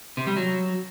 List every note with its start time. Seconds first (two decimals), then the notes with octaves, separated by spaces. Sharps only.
0.17 C3
0.27 G3
0.37 F#3